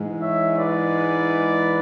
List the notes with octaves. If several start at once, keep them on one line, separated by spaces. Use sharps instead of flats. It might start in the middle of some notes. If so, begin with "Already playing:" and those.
Already playing: G#2 E3 G#3
C#5 E5
B4 D5